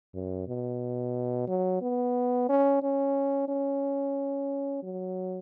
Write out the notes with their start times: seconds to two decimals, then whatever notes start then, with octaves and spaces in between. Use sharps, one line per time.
0.15 F#2
0.48 B2
1.48 F#3
1.82 B3
2.49 C#4
2.83 C#4
3.49 C#4
4.83 F#3